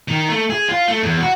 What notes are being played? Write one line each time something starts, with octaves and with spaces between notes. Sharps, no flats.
D#3
A3
G#4
F4
A3
E2
F#4